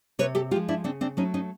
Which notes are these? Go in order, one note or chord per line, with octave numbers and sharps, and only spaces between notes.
C3 B4 C#5
G4 A4
F3 G#3 F4 G4
D4 E4
C#3 C4 D4
C4 D4
F#3 A3 C#4 D#4
C#4 D#4